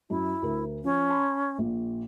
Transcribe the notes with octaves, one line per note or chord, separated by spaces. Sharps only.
F#2 E4
D2 A#4
F3 C#4
A5 B5 C6
A#1 A#2